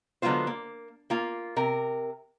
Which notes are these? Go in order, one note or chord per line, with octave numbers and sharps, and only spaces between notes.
D3 F#3 G#3 B3 F4 C5
A#3
A#3 F4
C3 A#4